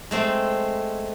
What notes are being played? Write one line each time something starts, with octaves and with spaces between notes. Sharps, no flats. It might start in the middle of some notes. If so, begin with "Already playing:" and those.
G#3 A3 C4